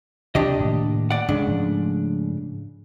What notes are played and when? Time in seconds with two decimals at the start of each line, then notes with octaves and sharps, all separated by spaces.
0.35 D2 C3 D4 G4 D#5
0.61 A2 D#3 A#3
1.11 D5 F#5
1.29 G#2 C#3 D4
1.47 G#2 F3 A3